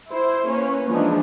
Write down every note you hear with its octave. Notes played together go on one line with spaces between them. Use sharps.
E4 C5
A#3 C#4 B4
E3 F3 G#3 B3 D4 D#4